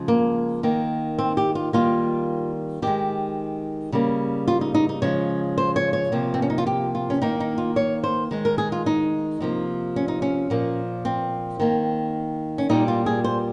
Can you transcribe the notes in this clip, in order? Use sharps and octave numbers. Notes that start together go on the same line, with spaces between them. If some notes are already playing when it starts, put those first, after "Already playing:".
Already playing: C#3 F3 G#3
A#3
D#3 A#3
C4
G4
F4
D#3 G3 A#3 F4
D#3 G#3 G4
C#3 G3 A#3
F4
D#4
D#4
D#4
C#3 F3 G#3 C#5
C5
C#5
C#5
C3 F3 A#3
C4
C#4
D#4
F4
G4
F4
C#4
D#3 A#3 D#4
D#4
F4
C#5
C5
D#3 G#3
A#4
G#4
F4
D#4
C3 F3 A#3
C#4
D#4
C#4
A#2 F3 A#3
C4
D#3 A#3
C#4
A#2 G3 A#3 D#4
F4
G#4
C5